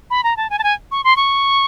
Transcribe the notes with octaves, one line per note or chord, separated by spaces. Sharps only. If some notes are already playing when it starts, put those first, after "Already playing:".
B5
A#5
A5
G#5
A5
G#5
C#6
C6
C#6